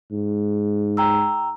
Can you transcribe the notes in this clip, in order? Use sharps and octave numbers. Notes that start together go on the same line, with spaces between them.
G#2
G5 A#5 E6